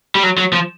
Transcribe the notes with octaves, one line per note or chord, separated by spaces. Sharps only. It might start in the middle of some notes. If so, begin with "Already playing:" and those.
G3
F#3
F#3
F3